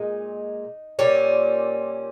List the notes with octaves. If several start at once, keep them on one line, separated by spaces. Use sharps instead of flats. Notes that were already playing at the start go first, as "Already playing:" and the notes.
Already playing: A#2 G#3 D#4
A#2 G3 C#4